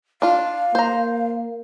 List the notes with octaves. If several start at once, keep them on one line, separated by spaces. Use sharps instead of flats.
D4 F4 F5
A#3 C5 A#5